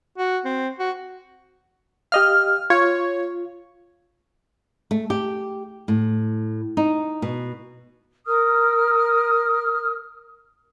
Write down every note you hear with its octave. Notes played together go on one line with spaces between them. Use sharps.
F#4
C4
F#4
G4 D#5 F5 F6
F4 C#5
A3
G4
A2
D#4
B2
A#4 D#6 F6